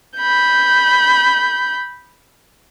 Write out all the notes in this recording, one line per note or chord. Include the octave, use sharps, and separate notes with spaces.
B5 G6